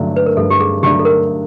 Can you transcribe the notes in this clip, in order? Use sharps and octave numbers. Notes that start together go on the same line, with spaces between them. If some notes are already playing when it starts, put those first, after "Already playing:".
Already playing: G2 D3 F#3 A3 D4
B4
A#4
G2 A4
G4
G#4
D3 F#3 A3 D4 G4
A4
A#4